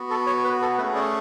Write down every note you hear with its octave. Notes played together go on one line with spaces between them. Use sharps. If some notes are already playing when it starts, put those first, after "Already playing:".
Already playing: B3 F#4
A4
C#5
B4
A4
A3 C#4 G#4 B4
D5